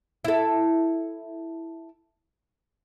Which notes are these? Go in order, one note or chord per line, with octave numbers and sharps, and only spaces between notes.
E4 A4